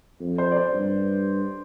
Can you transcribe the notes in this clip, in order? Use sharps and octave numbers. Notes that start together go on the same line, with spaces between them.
F2
C5
D5
C5
G2